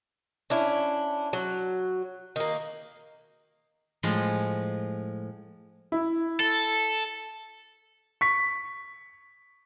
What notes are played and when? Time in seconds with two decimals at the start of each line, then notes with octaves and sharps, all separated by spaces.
0.50 C#4 D4 E4
1.33 F#3
2.36 D#3 A#3
4.03 A2 F3 G#3 C6
5.92 E4
6.40 A4
8.21 C#6 B6